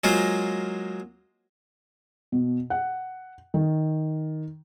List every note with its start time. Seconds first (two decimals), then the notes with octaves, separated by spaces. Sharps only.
0.04 F#3 G#3 A#3 F4 C5
2.32 B2
2.70 F#5
3.54 D#3